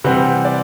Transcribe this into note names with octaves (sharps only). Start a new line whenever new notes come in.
C3 E3 G3 C4 F#5
D5